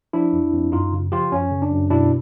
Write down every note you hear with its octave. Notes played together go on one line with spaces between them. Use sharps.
F3 D4 E4
F2
F2
F#2 D#4 F4
C#3
F3 F4 G4
F#2 C#4
C#3
D4
F#2
B2 D4 E4